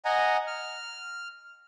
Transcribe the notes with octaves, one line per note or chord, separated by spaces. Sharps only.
D#5 F#5 G#5 A#5
F6